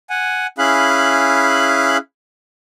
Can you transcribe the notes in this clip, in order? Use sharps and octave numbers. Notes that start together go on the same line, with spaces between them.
F#5 G#5
C#4 E4 G#4 F5 B5 F#6